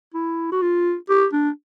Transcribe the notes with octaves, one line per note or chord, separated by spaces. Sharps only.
E4
F#4
F4
G4
D4